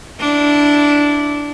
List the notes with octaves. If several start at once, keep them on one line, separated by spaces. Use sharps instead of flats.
D4 E4